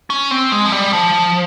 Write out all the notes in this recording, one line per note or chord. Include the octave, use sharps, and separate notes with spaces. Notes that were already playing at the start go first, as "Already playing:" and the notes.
C#4
C4
G#3
F3
G3
F3